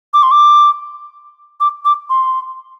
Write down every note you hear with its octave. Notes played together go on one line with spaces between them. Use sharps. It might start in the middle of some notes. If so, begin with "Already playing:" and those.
D6
C6
D6
D6
D6
C6